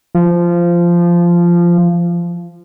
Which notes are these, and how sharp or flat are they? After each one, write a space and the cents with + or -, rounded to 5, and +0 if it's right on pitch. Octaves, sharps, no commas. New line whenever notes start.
F3 -15